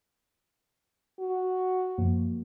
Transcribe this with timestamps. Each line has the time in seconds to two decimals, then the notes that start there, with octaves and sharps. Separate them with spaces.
1.20 F#4
1.98 F#2 F3 A#3